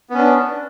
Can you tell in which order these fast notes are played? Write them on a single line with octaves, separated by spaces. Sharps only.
B3 C#4 D4